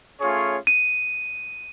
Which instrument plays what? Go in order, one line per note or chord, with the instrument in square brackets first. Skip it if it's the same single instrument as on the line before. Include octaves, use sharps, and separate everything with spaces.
[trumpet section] A3 C#4 F4 G#4 C#5
[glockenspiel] D#7